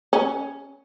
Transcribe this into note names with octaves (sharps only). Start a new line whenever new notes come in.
C#4